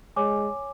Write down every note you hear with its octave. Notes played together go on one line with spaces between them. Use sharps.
G#3 C#5 G#5 D6